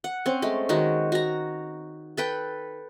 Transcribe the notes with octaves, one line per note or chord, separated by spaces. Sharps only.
F#5
C4 C#4
G#3 A3
D#3 G#3 F#4
F#4 A#5
A4 B4 G5